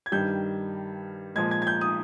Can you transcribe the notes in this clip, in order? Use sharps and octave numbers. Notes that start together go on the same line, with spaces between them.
G#6
G2 D#3 G3 G6
A#2 F3 G#3 G#6
G#6
G#6
G6
D#6